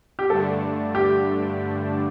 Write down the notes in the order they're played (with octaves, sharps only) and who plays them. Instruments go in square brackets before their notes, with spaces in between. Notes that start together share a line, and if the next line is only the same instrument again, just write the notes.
[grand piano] G4
[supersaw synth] G2 D3 A3 D4 [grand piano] A4
[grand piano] G4